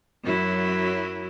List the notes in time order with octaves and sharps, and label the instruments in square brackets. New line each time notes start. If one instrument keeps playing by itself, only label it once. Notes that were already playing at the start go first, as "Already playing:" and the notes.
[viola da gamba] F#2 F#3 E4